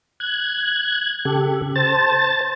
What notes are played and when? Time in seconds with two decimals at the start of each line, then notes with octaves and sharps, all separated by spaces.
0.20 F#6 G#6
1.25 C#3 G4 A4
1.76 C5 A5 A6